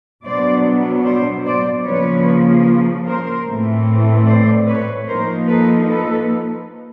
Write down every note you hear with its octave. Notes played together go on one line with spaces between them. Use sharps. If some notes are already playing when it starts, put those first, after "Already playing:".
B2 F#3 B3 D4 C5 D5
C5 D5
C5 D5
C#3 F3 A#3 B4 C#5
A#4 C5
A2 E3 A3 C4
C5 D5
B4 C#5
F3 A#3 D#4 A#4 C5
A4 B4
A4 B4